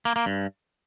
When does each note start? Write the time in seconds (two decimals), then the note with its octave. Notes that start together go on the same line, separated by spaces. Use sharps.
0.05 A#3
0.16 A#3
0.26 G2